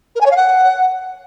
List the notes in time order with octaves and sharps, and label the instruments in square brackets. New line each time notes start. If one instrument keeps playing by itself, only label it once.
[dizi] A#4
G#5
C#5
F5
F#5